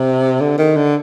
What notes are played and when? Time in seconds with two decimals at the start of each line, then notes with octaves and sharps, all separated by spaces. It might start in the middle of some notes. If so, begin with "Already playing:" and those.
Already playing: C3
0.41 D3
0.58 D#3
0.77 D3